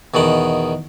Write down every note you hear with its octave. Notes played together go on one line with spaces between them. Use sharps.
E2 B2 D#3 F#5